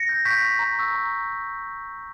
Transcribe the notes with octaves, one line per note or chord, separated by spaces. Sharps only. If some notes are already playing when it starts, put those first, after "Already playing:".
Already playing: A#6 C#7
G6
C#6 G6 B6
G6
A#5
C#6 E6
A#5